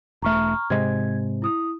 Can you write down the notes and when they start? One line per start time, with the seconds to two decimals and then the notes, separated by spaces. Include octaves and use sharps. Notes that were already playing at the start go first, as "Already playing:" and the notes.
0.22 E1 A3 A#5 C#6 F6
0.70 G#2 C3 G#3 G#6
1.42 E4 D#6